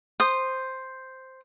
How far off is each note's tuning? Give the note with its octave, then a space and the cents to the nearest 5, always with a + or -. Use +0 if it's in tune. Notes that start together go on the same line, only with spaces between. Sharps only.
C5 +0 D#6 -15